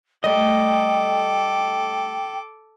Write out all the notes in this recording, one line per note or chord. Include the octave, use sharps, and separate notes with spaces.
G3 A3 A4 D#5 G5 D6